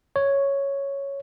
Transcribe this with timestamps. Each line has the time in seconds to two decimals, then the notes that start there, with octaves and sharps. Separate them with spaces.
0.16 C#5